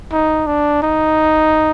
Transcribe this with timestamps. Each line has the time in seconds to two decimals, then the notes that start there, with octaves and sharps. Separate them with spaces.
0.12 D#4
0.47 D4
0.83 D#4